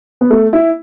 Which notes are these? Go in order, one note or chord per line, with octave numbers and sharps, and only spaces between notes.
B3
A3
E4